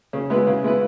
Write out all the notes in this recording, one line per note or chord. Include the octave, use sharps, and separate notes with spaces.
C#3
G#3 B3 E4 B4
C#3
G#3 B3 E4 B4